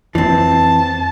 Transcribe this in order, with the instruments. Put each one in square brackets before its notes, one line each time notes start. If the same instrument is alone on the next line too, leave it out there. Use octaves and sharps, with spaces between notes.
[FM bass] F2 [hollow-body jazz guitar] E3 C4 [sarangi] A5